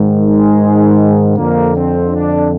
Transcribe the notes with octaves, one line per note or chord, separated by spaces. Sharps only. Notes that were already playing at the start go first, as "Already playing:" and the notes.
Already playing: G#2 D#3
G#3
F2 D3 A#3
C4
D4